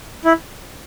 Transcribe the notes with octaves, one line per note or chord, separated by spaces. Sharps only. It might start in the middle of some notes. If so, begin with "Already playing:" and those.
E4